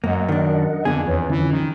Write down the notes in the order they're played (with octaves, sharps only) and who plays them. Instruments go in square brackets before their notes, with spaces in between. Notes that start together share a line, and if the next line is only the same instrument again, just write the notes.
[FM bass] F#2 [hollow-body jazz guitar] A#3 [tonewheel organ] D#5 F#5
[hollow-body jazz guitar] D#3 D4 [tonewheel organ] A#4 D#5 F#5
[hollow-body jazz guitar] F2 G#4 [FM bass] D3 [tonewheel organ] B3
[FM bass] E2 [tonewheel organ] B4 C#5
[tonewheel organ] D3 F3 C#4 [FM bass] E3
[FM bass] D#3